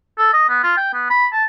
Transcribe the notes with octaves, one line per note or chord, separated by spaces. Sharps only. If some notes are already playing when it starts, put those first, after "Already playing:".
A4
D#5
B3
F4
G5
B3
B5
A5